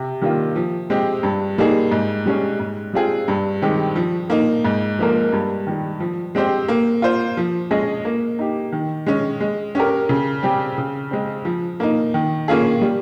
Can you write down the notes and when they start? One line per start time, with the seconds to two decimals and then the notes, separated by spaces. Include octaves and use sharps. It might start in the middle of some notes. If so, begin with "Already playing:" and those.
Already playing: C3
0.22 D#3 G3 A#3 F4
0.56 F3
0.90 G#3 C4 G4
1.23 G2
1.58 G3 A#3 D#4 G#4
1.91 G#2
2.26 G3 C#4 G#4
2.59 G#2
2.93 G3 C4 F4 G#4
3.28 G2
3.62 D#3 G#3 C4 G4
3.96 F3
4.30 A#3 D#4
4.65 G#2
4.99 F3 A#3 F4 A#4
5.32 G2
5.67 D#3 G3
6.00 F3
6.35 G#3 C4 G4 C5
6.68 A#3
7.02 F4 C5
7.37 F3
7.71 G#3 C#4 G#4 D#5
8.05 A#3
8.39 D#4 G4
8.72 D#3
9.06 G#3 C#4
9.40 G#3
9.75 C#4 G4 A#4
10.09 C#3
10.43 G3 C4 G4
10.78 C#3
11.11 G#3 C4
11.45 F3
11.80 A#3 D#4
12.14 D#3
12.48 A#3 C#4 F4 G#4
12.81 G3